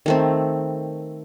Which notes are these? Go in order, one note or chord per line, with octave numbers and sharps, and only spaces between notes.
D#3 A3 C4